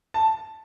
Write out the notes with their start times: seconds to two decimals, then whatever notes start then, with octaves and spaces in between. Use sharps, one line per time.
0.14 A5